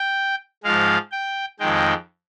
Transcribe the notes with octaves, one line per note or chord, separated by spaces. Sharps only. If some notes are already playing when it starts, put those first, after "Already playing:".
Already playing: G5
G#2 F3 G#3 F5
G5
F2 D#3 G#3 G5